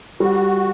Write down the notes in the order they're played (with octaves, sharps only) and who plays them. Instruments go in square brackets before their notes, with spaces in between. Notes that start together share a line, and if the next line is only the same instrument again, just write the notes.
[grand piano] G3 [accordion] F#4